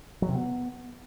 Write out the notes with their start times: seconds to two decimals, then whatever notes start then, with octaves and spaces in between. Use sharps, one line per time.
0.22 F#3
0.28 C3
0.35 B3